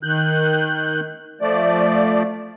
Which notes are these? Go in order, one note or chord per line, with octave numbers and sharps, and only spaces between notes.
D#3 F#6 G6
F3 A3 D5